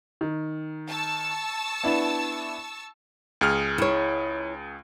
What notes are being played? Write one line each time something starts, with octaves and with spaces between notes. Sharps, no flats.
D#3
A5 C#6 E6
B3 D4 E4
C#2 G#4 F6
E4 C#5